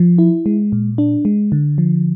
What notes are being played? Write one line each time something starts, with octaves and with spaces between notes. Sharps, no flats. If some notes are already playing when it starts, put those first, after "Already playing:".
Already playing: F3
E4
G#3
A#2
D4
G#3
D3
F3